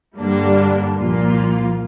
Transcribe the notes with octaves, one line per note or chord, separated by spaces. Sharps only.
G2 D3 G3 A#3 D4
C2 A#2 F3 A#3 F4